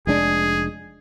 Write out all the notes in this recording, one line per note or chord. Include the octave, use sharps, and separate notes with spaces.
F1 G#3 D4 G#4